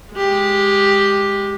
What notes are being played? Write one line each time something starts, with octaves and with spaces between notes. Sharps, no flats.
G#3 G4